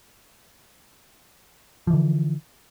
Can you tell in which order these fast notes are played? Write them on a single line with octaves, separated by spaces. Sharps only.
F3 E3 D3